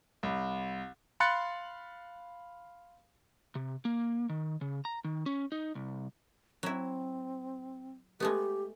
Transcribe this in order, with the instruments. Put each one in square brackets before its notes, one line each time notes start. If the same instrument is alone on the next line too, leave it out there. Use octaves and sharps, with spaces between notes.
[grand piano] C2
[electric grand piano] F5 B5 C6 F#6 A6 C#7
[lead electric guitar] C3
A#3
D#3
C#3
A#5
D#3
C#4
D#4
C2
[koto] F#3 E4 [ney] C4
[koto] G#3 A3 B3 [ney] G4